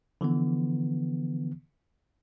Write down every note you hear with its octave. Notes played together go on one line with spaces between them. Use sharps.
D3 E3 F3 B3